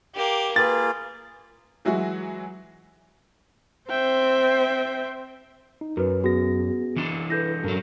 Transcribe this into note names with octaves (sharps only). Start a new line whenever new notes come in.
A#3 G4
A#3 F4 G#4 B4 A6
E3 F#3 G#3 E4 F#4
C4 C5 E5 G5
D#4
F#2 F#4 A#4 B4
B3 F#4 G#4 A#6
E3 D4
E4 A4 B4 G6 A#6
G2 F#3 A4 A#4